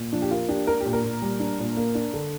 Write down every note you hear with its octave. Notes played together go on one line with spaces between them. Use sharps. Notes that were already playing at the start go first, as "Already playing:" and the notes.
Already playing: A#2
F3 D4
G4
A#3 F4
D4 G4
D4 A#4
G4
A#2
A#4
A#2
G3
D4
A#2
A#3
D4
D3